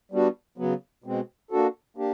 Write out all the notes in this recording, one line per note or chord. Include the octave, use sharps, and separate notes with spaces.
G3 B3 D4 F#4
C#3 F#3 B3
B2 G#3 C4
A#3 D4 F#4 A4
A#3 D4 G4